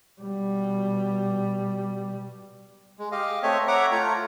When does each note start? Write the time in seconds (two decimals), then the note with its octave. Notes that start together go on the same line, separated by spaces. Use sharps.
0.22 B2 G3
2.99 G#3
3.12 G4 D#5 F5
3.43 A3 C4 C#5 D#5 E5
3.68 C#5 E5 F#5 A#5 D6
3.91 A3 F4 A#5